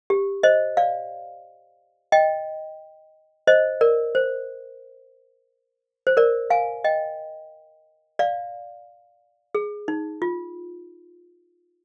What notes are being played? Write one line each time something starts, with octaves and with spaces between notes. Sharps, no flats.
G4
C5 D#5
D5 F5
D#5 G5
C5 D#5
A#4 D5
C5
C5
A#4 D5
F5 G#5
D#5 G5
D5 F5
G#4
D#4
F4